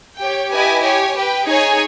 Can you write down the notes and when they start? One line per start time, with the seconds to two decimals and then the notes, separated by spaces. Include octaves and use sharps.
0.18 G4 C#5 G5
0.50 E4 G4 B4 D#5 G#5
0.82 G4 C#5 G#5
1.14 G4 B4 G5
1.45 D#4 G#4 C#5 G#5